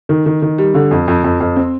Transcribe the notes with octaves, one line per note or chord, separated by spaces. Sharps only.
D#3
D#3
D#3
G3
D3
F2
F2
F2
F2
C4